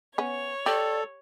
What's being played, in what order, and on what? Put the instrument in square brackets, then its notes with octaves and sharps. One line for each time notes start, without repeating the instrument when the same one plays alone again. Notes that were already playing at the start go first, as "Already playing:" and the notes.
[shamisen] B3 C#4 [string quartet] C#5
[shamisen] G4 [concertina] A4 [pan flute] D5